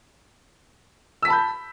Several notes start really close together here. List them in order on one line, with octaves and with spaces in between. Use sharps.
E6 B6 A5 B5 G6